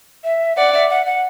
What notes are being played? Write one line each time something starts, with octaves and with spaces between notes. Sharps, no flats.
E5
D5 F#5
E5
F#5
F#5